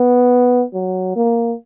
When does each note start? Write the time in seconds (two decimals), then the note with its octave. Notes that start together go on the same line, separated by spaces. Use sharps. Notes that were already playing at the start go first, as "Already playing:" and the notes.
Already playing: B3
0.73 F#3
1.16 A#3